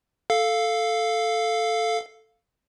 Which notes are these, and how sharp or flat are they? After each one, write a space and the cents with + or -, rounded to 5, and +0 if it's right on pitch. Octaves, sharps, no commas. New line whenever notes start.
A4 +0 F5 +0